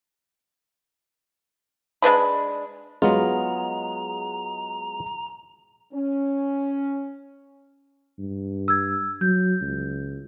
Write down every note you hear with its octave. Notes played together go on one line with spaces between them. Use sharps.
G#3 D4 B4 B5
F#3 G#3 B3 F4 A#5
C#4
G2
E6 G#6
F#3 G6
C#2